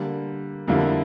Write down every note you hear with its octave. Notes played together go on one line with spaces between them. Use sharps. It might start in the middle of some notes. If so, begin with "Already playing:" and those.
Already playing: D3 G3 A#3
F2 D3 G3 A#3 E4